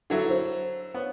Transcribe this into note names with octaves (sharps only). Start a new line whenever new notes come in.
D3 F#3 E4
C5
B3 C#5